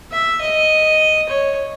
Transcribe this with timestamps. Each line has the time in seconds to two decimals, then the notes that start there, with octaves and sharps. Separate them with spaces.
0.11 E5
0.41 D#5
1.28 C#5